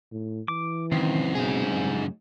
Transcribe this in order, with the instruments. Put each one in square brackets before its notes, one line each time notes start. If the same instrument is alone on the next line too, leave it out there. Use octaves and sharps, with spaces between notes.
[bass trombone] A2
[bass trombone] E3 [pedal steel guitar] D6
[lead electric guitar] C#2 F#2 [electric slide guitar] D#3 [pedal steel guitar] C4
[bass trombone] B2 [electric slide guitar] D#4 G#4
[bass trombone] G2